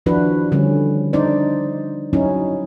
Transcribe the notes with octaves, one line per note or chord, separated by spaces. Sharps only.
D#3 F3 D4 E4 F#4 B4
D3 G3 C#4
D4 D#4 C5 D5
F#3 C#4 D#4 E4